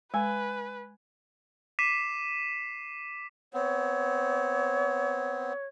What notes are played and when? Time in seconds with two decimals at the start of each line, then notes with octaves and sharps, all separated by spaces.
0.14 G#3 B4 G#5
1.79 D6 B6 C7 D#7 E7
3.53 B3 C4 C#5